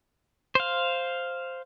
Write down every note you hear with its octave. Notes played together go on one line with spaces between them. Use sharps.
C5 F5